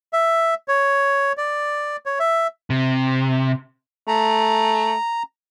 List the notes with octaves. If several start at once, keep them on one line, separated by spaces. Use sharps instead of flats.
E5
C#5
D5
C#5
E5
C3
A3 A#5